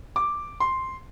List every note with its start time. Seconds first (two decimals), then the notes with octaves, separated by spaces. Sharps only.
0.16 D6
0.60 C6